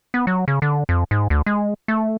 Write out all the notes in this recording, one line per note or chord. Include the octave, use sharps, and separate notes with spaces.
B3
F#3
C#3
D3
F2
G#2
D2
G#3
A3